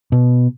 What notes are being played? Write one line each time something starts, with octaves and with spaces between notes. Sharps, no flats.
B2